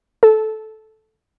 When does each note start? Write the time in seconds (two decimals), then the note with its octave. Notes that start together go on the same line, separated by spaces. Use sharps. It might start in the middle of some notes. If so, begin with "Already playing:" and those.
0.23 A4